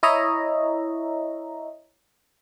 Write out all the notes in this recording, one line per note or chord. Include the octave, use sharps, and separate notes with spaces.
E4 C#5 D#5 E5 A#5